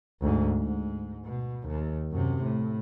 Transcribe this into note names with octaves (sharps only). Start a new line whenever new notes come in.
D2 G#2
G#2
B2
D#2
F#2 C3
A2